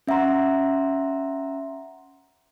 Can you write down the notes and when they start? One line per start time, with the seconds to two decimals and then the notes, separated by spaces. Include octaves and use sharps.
0.07 C#4 E5 F#5 A#5 C6